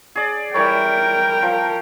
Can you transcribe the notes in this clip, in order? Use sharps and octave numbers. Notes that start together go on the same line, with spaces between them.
G#4 D5
E3 G3 A#4 C#5 G5
F3